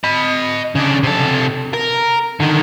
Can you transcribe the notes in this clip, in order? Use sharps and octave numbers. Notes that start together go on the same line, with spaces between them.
D#5 B5
C#3 D4
C3 A4
A#4
D3 D#3